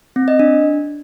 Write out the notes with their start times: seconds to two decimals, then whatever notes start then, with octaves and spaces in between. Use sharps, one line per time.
0.16 C4
0.28 D#5
0.40 D4